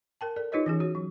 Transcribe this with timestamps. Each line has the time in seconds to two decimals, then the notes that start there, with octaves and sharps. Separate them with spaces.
0.21 A#4 G5 A5
0.36 A4 A#4 D5
0.52 D#4 F4 G4 B4 C#5 D#5
0.66 E3 C#4 G#4
0.80 F#4 C#5
0.95 F#3